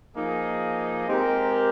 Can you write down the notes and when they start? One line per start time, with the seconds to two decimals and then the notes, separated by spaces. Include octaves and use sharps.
0.15 F3 A#3 D#4 G#4 D#5
1.07 G#3 C4 G4 A#4